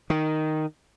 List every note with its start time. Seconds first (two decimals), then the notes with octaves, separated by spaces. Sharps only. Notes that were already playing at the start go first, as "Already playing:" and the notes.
0.10 D#3